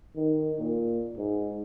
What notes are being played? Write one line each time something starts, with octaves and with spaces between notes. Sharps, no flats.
D#3
A#2
G#2